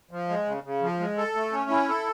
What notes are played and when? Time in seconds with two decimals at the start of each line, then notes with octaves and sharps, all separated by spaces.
0.11 F3
0.29 G#3
0.45 C#3
0.63 C#3
0.82 F3
1.00 G#3
1.18 A4
1.35 A3
1.52 C#4
1.70 E4
1.89 A4